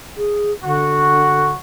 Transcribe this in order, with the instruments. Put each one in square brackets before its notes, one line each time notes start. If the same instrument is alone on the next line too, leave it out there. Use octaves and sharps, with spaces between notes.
[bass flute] G#4
[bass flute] D3 [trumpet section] F#4